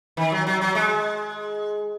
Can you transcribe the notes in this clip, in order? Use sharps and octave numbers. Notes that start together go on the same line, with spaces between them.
D#3
F#3
F#3
F#3
G#3